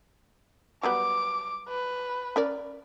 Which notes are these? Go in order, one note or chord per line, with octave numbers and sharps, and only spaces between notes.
F#3 G3 B3 D6
B4
C#4 A#4 D5